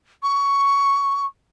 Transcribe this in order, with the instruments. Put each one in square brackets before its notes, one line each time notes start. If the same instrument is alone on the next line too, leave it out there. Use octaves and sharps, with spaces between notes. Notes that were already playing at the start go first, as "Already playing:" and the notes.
[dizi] C#6